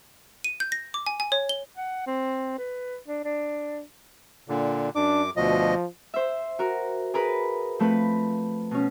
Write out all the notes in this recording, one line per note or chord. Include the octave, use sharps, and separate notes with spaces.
D#7
G6
A#6
D6
G#5
G#5
C#5
G7
F#5
C4
B4
D4
D4
A#2 D3
F#2 D4 D6
D2 B2 F3 D#5
C5 E5
F#4 A#4
G#4 A#4 B4
F3 A3 C4 B4
B2 C#4